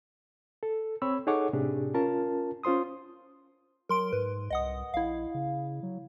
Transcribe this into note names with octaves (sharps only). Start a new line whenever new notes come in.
A4
C4 C#5 B5 E6
D#4 G#4 A4 C#5 F#5 D6
A2 C3 D4 G4 G#4
C#4 F4 A#4 A5
C#4 F4 C5 C6 D#6
F#3 A#4 C6 D7
G#2 B4
C2 D#5 F#5 D#6
A#1 E4 F5
C#3
F#3